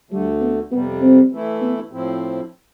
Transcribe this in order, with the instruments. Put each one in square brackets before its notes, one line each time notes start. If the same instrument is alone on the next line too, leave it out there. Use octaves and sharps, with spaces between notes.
[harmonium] D2 D3 A3 [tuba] G3
[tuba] B3
[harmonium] F2 C3 G3 [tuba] B3
[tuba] C4
[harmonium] E3 A3 E4
[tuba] B3
[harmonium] A2 F3 C4 E4